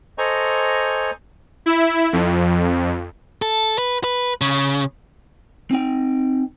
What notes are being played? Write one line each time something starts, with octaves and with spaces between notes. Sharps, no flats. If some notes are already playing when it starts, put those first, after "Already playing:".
A4 C5 D#5 G#5 A#5 C#6
E4
F2
A4
B4
B4
C#3
C4 D#4 G5